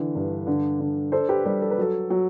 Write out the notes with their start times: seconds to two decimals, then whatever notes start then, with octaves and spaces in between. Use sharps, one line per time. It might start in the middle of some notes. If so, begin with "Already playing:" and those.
Already playing: D3 E3
0.15 G2
0.47 D3
0.80 D3
1.12 D4 A4 C5
1.29 G4 B4
1.45 G3 A4
1.62 A4
1.71 B4
1.78 F#3 A4
2.10 F#3